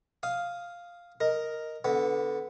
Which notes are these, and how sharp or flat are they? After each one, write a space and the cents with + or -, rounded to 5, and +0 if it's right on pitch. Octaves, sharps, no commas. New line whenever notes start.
F5 +0 D#6 +5
A#4 +0 D#5 +0
D3 -15 B3 +0